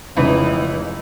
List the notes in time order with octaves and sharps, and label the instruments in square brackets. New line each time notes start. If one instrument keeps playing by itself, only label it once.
[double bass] F1 [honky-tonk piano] C#2 B4 [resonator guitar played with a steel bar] E3 D#4